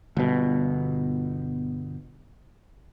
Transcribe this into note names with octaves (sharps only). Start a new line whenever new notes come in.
G1 B2